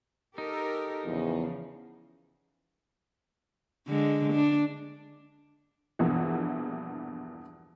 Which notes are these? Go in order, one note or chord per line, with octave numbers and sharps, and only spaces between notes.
D#4 G4 A4 A#4
E2 C#3 F3
D3 G#3
D4
A#1 E2 G2 B2 E3 A#3